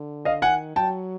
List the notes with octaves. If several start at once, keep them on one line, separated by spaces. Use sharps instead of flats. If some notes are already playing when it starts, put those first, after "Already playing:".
Already playing: D3
D#5 F5
D#3 F#5 G#5
F#3 G5 A5